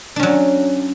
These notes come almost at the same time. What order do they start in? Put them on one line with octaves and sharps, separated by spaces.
D4 C#4 F#3